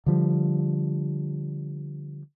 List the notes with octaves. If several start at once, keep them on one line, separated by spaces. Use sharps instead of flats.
D3 F3 G3